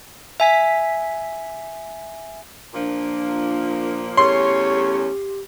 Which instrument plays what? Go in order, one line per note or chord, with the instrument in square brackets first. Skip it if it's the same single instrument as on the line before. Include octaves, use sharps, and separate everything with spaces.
[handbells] E5 G#5 B6
[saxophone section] A#2 F3 A#3 [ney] D4
[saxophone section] E2 A3 C#4 [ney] G4 [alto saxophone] C#5 [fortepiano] C6